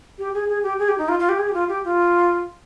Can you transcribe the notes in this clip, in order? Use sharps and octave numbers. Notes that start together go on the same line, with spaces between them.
G4
G#4
G#4
G4
G#4
G4
D#4
F4
F4
G4
G#4
G4
F4
G4
F4